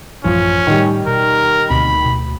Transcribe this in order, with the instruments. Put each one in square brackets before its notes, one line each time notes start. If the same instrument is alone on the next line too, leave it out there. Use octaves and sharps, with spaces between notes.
[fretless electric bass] A1 F#2 E3 [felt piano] F3 [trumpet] C#4
[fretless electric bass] A2 [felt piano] D#3 G3
[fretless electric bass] B2 [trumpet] A#4
[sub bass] D2 [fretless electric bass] B2 D3 C4 [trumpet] B5
[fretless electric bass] B2